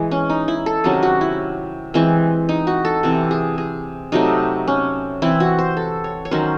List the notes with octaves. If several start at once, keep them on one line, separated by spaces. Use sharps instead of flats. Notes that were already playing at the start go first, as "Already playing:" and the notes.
Already playing: E3 G#3
C#4
D#4
E4
A4
C3 D#3 F#3 C#4 G#4
F#4
E4
E3 G#3 C4
D#4
F#4
A4
C3 E3 C4
G#4
G#4
C3 F#3 A3 D#4
C#4
E3 C4 E4
F#4
C5
A4
C#5
C#5
D#3 F#3 C#4 C5